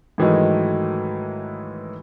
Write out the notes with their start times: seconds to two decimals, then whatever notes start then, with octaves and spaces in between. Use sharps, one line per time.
0.18 G#2 D#3 E3 F#3 G#3 A3